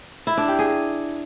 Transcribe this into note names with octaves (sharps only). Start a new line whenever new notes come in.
E4
D4
G4
G#4